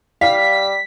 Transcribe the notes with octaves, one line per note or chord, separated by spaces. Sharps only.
G3 F5 B6